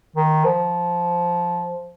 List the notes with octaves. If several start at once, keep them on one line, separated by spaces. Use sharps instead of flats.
D#3
F3